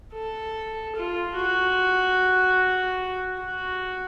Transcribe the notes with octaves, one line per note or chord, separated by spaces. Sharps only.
A4
F4
F#4
F#4